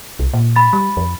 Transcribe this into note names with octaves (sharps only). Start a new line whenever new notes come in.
C2
A#2
B5 A6
G3
F2